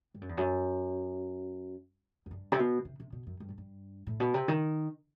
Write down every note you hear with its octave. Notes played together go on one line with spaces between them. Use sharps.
G2
F#2
E2
F#2
F#2
G2
C3
B2
C3
C3
B2
F#2
G2
A2
G2
A2
B2
C3
D#3